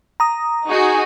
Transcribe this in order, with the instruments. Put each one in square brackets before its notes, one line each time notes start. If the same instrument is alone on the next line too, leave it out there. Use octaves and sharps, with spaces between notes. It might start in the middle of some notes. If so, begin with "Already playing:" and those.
[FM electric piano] A#5 D#6
[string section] D#4 F#4 G#4